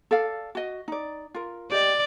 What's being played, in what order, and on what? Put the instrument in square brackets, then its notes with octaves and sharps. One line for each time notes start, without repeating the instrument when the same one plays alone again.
[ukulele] A4 D5 F5
F#4 D#5
D#4 D5
F4 A#4
[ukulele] G4 D#5 [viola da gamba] D5